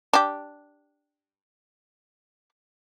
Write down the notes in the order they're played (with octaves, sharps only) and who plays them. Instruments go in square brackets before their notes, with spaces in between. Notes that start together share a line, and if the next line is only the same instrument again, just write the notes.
[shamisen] D4 G4